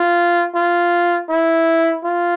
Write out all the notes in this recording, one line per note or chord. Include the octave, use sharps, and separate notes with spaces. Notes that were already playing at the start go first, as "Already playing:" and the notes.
Already playing: F4
F4
E4
F4